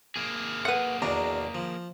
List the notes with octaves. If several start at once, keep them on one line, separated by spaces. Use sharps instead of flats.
A#3 G#4
B4 F#5
E2 B2 D4 A#5
F3